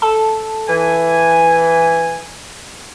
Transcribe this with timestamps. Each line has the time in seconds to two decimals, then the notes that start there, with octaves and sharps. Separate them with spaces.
0.02 A4
0.68 E3 G#5